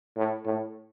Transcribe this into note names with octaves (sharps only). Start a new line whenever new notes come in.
A2
A2